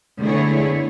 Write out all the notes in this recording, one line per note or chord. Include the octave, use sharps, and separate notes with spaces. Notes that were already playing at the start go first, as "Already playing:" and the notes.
D3 A3 B3 E4 G#4 C#5